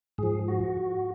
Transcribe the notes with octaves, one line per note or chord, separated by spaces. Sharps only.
G#2 F3 G#4
F#4